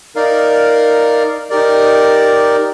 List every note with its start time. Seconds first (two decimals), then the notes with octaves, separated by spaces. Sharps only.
0.15 D#4 A#4 D5 F5
1.50 D#4 G4 A#4 D5